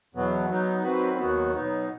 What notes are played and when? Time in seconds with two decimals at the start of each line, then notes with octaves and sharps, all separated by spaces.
0.14 E2 B2 F#3 B3
0.49 F#3 B3 D#4
0.84 D#3 F#3 C4 F#4 B4
1.19 D#2 D#3 F#3 B3 F#4
1.54 B2 F#3 B3 D#4